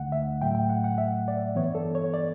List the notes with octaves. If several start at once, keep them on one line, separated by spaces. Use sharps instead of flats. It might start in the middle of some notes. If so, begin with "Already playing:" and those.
Already playing: D2 D3 A3 F#5
E5
A2 F#3 A3 G5
G5
F#5
F#5
E5
D5
G2 E3 B3 C#5
A4
C#5
D5